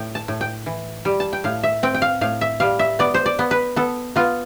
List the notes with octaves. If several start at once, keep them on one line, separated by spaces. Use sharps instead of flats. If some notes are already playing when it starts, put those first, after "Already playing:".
Already playing: A2 G5
A5
A2
G5
E3
G3
A5
G5
A2 F5
E5
C4 G5
G5
F5
A2 F5
E5
G3 F5
E5
B3 D5
C5
D5
B3
B4
B3 A4
B3 F4